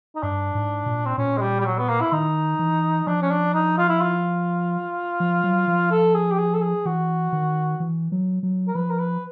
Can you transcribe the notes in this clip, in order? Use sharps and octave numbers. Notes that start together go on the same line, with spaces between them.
D#4
G2 D4
G#2
A#2
C4
A#2 C#4
G#3
G3
G3
F#3
B3
A#3
E4
D#3 D#4
E3
F3 D4
C#4
D4
D#4
F4
E4
F4
F3
F#3
F3
A4
G#4
G4
G#4
A4
G#4
E3 F#4
D#3
E3
F#3
F#3
A#4
F3 B4
A#4
B4